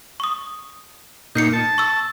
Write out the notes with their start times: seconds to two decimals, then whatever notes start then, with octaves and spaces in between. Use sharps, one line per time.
0.20 C#6 D#6
1.35 A#2 D#4 G6 C7 C#7
1.53 A5
1.78 C#6 E6